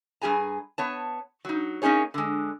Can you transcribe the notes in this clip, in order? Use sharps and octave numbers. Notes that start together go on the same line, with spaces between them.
G2 C#3 G#4 G#5 A#5
B3 C#5 A5
F#3 D#4
A#3 C#4 D#4 G#4 C#5
D3 G#3